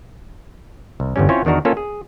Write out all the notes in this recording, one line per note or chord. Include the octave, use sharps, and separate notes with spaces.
C2
G1 E2 G2 G3 C#4
C4 C#4 E4 F4 C5 C#5
E2 D#3 D4 F#4 A#4
A#3 C#4 F4 A4
G#4